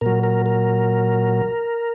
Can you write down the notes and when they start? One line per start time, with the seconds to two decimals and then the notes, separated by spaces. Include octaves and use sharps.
0.01 A#2 F#3 A#4
0.23 A#4
0.46 A#4